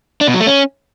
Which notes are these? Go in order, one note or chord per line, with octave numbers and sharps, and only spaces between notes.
D4
B2
F#3
A3
C#4